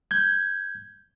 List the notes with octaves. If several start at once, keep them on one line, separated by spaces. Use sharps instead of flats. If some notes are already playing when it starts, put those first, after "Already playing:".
G6 G#6